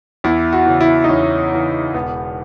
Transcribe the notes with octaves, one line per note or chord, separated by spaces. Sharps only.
E2 E4
F#4
C#3 E3
E4
D#4
E2 C#4
C#3 E3
E1 B3